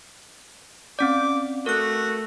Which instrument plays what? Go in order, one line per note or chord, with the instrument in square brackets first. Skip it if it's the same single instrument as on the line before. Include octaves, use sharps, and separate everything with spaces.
[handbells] C4 C#4 D5 [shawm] D6
[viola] A3 [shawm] F#4 [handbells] A#4 F#6